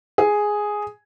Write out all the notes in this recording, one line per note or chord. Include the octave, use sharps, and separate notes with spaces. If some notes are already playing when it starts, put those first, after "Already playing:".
G#4